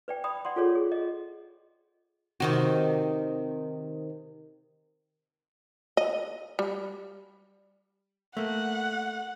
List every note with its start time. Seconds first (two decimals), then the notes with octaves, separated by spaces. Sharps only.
0.08 B4 D5 G5
0.24 D5 G5 B5 D#6
0.45 D5 F#5 C6
0.56 F4 G#4 A4 C#5 D5
0.75 G#4
0.92 D#5
2.40 C3 D#3 F#4
5.97 D#5
6.59 G3
8.37 A3 A#3 F#5